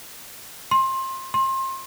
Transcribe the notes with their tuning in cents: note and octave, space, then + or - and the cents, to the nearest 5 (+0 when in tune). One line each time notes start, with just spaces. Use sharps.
C6 +25
C6 +30